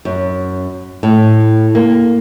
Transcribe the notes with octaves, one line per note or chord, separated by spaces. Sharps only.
F#2
A2
A#3